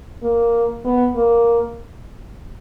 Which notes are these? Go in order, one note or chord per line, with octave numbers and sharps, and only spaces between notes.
A#3
B3
A#3